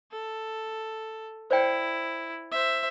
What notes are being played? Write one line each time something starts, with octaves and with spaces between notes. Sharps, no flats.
A4
E4 C5 D5 G5
C5 E5